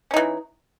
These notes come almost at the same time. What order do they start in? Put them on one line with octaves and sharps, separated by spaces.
C#4 D#4 E3